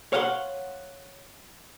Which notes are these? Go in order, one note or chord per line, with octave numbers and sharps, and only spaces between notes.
C#5 F5 F#5 G#5 C6